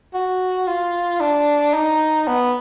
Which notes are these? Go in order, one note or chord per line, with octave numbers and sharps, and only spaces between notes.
F#4
F4
D4
D#4
B3